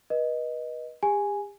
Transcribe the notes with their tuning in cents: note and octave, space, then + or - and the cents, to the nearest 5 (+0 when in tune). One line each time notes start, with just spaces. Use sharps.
B4 -35 D#5 -5
G4 +45 G#5 +0